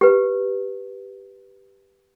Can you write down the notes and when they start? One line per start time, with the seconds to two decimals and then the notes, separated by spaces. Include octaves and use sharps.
0.01 G4 B4